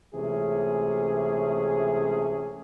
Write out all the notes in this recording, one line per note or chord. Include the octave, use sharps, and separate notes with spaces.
C#2 C3 E3 A3 C#4 G#4